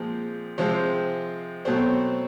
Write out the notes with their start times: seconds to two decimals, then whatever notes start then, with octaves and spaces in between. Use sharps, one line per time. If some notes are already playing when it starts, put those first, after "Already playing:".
Already playing: A#2 F3 G#3 C4
0.58 C3 F3 G#3 C4 C5
1.65 B2 F#3 A3 C4 C5